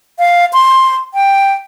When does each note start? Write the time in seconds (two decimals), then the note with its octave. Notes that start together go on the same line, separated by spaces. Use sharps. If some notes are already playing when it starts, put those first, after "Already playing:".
0.19 F5
0.53 C6
1.14 G5